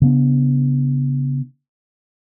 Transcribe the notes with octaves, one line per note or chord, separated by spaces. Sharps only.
C#3 B3 D4